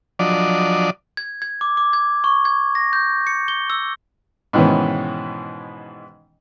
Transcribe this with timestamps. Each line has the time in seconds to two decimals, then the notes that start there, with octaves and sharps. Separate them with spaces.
0.19 F3 F#3 D4 D5 D#5
1.17 G#6
1.42 G#6
1.61 D6
1.77 D6
1.93 G#6
2.24 C#6
2.45 G#6
2.75 A#6
2.93 G6
3.27 C#7
3.48 G7
3.70 E6
4.53 G#2 B2 D#3 E3 B3 C#4